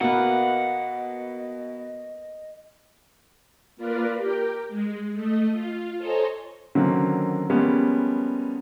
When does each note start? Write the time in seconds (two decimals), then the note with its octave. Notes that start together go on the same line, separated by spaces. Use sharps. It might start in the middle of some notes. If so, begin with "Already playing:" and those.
0.01 B2 A#3 B3 D#5 F#5
3.77 A#3 F4 A#4 B4 D5
4.17 G4 A#4 G5
4.69 G#3
5.12 A3 D#5
5.52 F4
5.97 A4 C5 C#5 D#5 G#5 A#5
6.75 D3 D#3 F#3 A#3 C4 C#4
7.50 F3 G3 G#3 A#3 B3 C#4